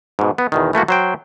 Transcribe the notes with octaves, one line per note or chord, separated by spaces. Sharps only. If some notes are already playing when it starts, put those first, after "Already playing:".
G#2 B2
B3
E2 B2 D#3
E3 A3 A#3 F#4
F#3 C5 G5